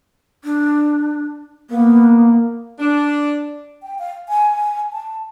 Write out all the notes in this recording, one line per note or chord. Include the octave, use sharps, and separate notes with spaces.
D4
A#3 B3
D4
G5
F5
G#5
A5